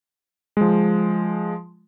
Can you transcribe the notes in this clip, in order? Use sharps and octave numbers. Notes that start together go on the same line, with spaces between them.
F3 G#3